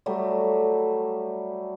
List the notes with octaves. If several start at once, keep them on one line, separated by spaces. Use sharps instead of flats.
F#3 G3 A3